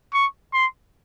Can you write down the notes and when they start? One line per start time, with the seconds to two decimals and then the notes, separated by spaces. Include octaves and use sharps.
0.13 C#6
0.54 C6